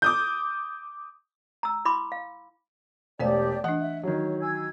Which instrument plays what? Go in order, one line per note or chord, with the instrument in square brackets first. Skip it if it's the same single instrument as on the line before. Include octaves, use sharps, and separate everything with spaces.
[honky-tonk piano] D6 D#6 G6
[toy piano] A#5 E6
E4 B5 C6 D6
F5
[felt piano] E1 [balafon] A3 C5 F5 [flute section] G4 D5
[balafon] E3 D4 [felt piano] F#5
[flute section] E5
[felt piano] D#3 F#3 [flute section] C#5
[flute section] G#5 E6 G#6